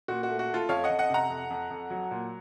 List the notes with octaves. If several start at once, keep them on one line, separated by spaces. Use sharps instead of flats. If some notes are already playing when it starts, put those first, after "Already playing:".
A#2 F#4
F#4
A3
F#4
A3
F4 A4
F2 C#5 F5
D#5 F#5
F2
D#5 F#5
C3 F#5 A#5
F2
F2
F2
F#3
A#2